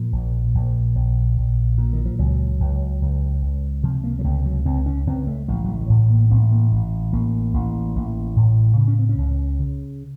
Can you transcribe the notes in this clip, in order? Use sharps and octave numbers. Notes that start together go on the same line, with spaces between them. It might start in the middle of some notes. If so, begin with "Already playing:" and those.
Already playing: A#2 F3
A#1
A#1
A#1
A#1
A#2
D#3
F3
C#2 F#3
C#2
C#2
C#2
C3 F3
A#3
F#3
C#2 A3
F#3
C#2 C4
C#4
C#2 C4
A3
A1 F3
F#3
A3
A2
A#3
A1 C4
A3
A#3
A1
A1 A#3
A1
A1
A2
C#3
C#4
C4
C#4
C#2
C#3